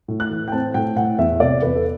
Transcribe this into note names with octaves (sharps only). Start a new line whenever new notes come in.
A2
F#6
E3
G5
C4 A5
A2 G5
A2 F#5
E2 E5
C3 D5
E2 B4
A4